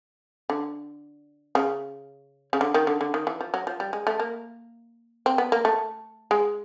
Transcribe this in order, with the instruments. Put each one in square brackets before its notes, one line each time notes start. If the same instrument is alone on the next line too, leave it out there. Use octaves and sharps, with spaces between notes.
[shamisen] D3
C#3
C#3
D3
D#3
D3
D3
D#3
E3
F3
F#3
F3
G3
G#3
A3
A#3
C4
B3
A#3
A3
G#3